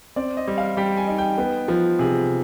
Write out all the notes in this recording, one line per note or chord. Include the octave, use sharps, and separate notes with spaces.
C4 D5
D#5
G3
F5
G3 G5
G#5
D#4
G5
B3
F3
C3 G#4